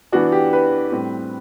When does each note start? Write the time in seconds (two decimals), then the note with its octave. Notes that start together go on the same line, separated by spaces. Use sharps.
0.12 E3 B3 D4 F#4
0.32 G4
0.53 B4
0.92 A2 G3 C4